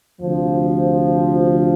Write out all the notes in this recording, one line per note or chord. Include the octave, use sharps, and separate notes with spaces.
D2 C3 F3